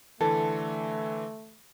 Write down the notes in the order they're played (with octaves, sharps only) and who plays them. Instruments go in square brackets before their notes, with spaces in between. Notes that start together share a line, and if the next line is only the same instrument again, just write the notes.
[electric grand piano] D3 E3 [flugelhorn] A3 [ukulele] A4